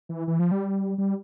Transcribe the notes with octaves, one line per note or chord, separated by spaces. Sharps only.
E3
E3
F3
G3
G3